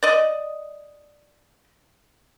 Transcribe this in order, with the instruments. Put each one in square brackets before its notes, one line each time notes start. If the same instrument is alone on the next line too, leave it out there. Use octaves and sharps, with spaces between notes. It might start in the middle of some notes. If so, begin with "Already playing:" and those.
[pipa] D5 D#5